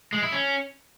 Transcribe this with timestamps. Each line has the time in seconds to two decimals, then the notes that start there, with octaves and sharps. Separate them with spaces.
0.13 G#3
0.22 E4
0.32 C#4